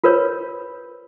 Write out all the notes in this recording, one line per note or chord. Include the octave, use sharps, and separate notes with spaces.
F4 A#4 B4 C#5